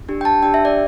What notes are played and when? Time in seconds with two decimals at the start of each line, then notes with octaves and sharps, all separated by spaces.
0.09 D4 G4
0.21 G5
0.25 A5
0.42 D4 G4 G5
0.54 E5
0.65 D5